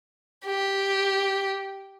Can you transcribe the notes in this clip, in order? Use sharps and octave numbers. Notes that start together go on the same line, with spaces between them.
G4